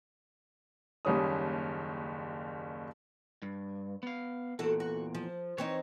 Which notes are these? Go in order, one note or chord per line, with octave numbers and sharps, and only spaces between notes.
F#1 D#2 G3 C#4 D#6
G2
B3 F5
E2 A#2 F#4 A4
F#4
F3
E3 C4 D#4 C#5